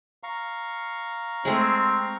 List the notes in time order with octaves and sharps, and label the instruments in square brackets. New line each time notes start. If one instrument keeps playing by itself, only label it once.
[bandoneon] F5 A#5 C#6
[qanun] G#3 A3 G#4 [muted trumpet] C4